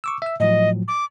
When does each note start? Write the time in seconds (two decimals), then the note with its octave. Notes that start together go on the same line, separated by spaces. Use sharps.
0.04 C#6 D6 E6
0.22 E5 E6
0.40 A2 F3 F#3 D#5
0.88 D6